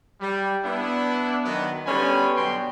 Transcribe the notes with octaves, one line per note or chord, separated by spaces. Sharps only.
G3
B3 D4 E4
D#3 F#3 B3
D3 G3 B3 C#4 G#5 B5
B2 D3 F#3 G5 C6